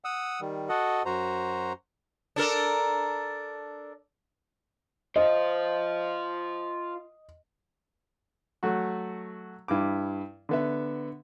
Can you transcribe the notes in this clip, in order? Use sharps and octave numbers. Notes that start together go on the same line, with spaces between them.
F#5 D#6 E6
D#3 G3
F#4 A4 D#5 F#5
F#2 F#4 C5 A#5
D4 A4 A#4
F4 C5 D#5
F#3 A3 F#4
G2 E4 D6
D3 B3 E5